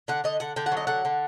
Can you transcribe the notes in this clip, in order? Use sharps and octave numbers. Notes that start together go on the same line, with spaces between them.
D3 F#5
D3 D#5
D3 F#5
D3 G5
F#5
F#3
D#5
D3 F#5
D3